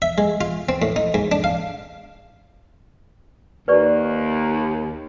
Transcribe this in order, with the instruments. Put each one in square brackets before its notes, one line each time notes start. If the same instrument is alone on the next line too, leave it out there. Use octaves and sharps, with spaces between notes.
[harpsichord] E5
G#3
F4
C4
A2
D#4
G#2
D4
F5
[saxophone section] D#2 [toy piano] B4 D5 C#6